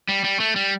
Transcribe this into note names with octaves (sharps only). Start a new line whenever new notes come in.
G3
G3
A3
G3